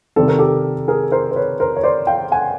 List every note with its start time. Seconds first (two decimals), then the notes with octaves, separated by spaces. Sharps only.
0.16 C3 D#3 G3 C4 A4
0.28 A#4
0.39 G4 A4
0.88 G#4 A#4
1.12 A#4 C5
1.31 C5
1.36 B4 C#5
1.60 A#4 C5
1.76 C#5
1.83 C5 D5
2.07 F5 G5
2.32 F#5 G#5